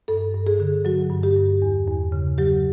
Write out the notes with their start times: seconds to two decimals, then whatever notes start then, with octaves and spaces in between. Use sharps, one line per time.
0.08 G2 A4
0.34 G2
0.47 G#4
0.60 D3
0.85 F#3 F#4
1.10 G2
1.23 G4
1.37 G2
1.62 E2
1.87 E2
2.12 C#3
2.38 F#3 G4